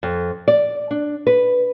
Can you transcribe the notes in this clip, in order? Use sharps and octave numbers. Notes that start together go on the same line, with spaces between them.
F2
D5
D4
B4